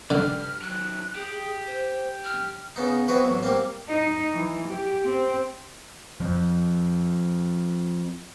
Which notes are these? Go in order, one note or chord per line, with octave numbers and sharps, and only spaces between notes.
G2 D3 F6
D#3 F#3 F#6
G4 G#4
C5
F6
C#3 B3 D#4
B3 C4 E4 F#4 B4
A1 F#3
G3 A#3 C4
D#4
E3
G4
C4
F3 C4